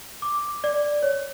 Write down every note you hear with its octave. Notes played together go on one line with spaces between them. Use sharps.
D6
D5
C#5